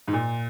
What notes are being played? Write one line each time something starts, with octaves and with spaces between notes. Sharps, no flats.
G#2
A#2